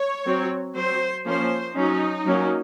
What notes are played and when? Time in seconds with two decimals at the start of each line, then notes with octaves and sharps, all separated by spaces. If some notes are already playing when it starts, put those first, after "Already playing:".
Already playing: C#5
0.25 F#3 C4
0.74 F#3 C4 C5
1.25 F3 A#3 C#4 C5
1.75 F#3 C#4 D#4
2.26 F#3 A#3 C#4